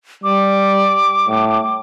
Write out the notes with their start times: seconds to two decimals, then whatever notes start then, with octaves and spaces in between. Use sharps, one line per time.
0.24 G3 D6
1.29 A2